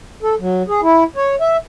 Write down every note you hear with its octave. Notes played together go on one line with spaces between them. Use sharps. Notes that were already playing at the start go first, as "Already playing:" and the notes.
A4
F#3
G#4
E4
C#5
E5